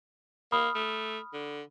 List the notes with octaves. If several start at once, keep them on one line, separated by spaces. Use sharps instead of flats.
A#3 B5 D#6 F6
A3
D3